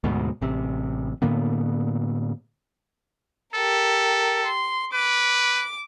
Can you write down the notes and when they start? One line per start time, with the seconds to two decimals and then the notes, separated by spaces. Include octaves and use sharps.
0.04 D2 G#2 B2
0.41 A1 C3
1.22 A2 D3 A#3 B3
3.55 G4 A4 A#4
4.46 C6
4.94 B4 D6